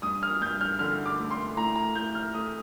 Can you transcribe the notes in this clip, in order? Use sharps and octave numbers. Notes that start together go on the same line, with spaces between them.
G2 D#6
F6
G2 G6
F6
D3 F6
D6
A3
C6
A2 A#5
A#5
A2 G6
F6
A3 D#6